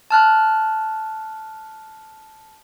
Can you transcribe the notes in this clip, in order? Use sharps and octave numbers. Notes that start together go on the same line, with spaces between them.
A5 F6 F#6